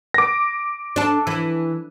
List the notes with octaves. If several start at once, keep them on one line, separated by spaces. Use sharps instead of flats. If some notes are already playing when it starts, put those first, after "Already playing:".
D6 A#6
D4 A4
E3